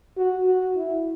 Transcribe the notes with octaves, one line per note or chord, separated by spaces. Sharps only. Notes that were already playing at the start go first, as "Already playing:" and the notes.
F#4
F#4
E4